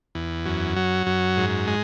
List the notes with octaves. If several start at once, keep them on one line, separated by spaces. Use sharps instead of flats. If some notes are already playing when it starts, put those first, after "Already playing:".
E2
F#2
F#3
F#2
G#2
G#3